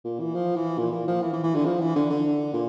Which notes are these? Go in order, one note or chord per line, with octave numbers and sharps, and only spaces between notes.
A#2
E3
F3
E3
A#2
A#2
F3
E3
E3
E3
D3
F3
E3
D3
D3
A#2